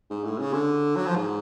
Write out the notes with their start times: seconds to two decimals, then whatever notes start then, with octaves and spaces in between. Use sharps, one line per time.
0.10 G#2
0.24 A2
0.39 C#3
0.54 D3
0.96 F#3
1.06 F3
1.16 G#2